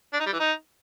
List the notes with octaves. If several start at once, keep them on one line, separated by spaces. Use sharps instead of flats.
D4
D#4
G3
E3
D#4